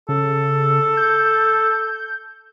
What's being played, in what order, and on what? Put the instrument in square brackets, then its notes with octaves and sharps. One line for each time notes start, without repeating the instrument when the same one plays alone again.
[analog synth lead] C#3 [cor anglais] A4
[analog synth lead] G6